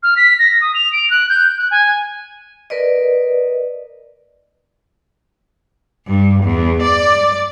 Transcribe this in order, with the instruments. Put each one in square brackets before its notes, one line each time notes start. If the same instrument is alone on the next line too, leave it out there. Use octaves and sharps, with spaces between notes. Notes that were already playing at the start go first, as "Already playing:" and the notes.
[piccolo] F6
B6
A#6
D#6
F7
D7
F#6
G6
F#6
G#5
[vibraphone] A#4 B4 D5 D#5
[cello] G2
E2
D5